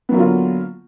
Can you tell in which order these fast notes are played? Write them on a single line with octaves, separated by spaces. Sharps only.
B3 F#3 A#3 D3 F4